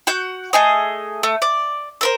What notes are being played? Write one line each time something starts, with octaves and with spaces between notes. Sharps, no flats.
F#4 F#5 G6
A3 G#4 D#5
A3
D5
A4 A#4 C5